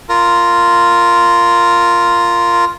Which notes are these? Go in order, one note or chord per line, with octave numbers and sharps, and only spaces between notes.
F4 A#4